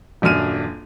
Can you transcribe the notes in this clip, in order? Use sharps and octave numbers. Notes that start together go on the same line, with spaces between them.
D#1 F#2 D4 F6 D#7